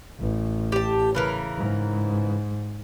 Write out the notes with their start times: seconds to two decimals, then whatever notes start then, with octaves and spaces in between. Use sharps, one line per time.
0.20 A1
0.72 G4 A5
1.15 C#3 E3 A#4
1.58 G#2